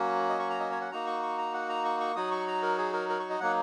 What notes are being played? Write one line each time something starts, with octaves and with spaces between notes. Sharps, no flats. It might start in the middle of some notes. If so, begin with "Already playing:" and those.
Already playing: F#3 A#3 C#4 F#4
D#5
C#6
A#5
D#5
C#5
F#5
A#3 D#4 F#4 A#5
C#6
C#6
A#5
F#5
A#5
C#6
C#6
F#3 D#4 F#4 D#6
C#6
A#5
A#4
G#4
A#4
A#4
C#6
D#5
F#3 A#3 D#4 F#5